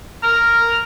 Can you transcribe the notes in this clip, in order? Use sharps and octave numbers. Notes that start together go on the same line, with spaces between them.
A#5 F6